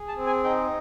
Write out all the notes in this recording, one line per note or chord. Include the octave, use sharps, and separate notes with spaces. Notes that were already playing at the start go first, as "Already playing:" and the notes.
Already playing: G#4
A5
C4
G#5
D#4 G5